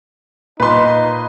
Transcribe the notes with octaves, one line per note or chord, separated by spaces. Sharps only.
A#2 D#4 B4 C6